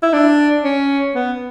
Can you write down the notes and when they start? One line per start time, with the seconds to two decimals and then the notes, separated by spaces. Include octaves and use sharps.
0.03 E4
0.13 D4
0.64 C#4
1.15 B3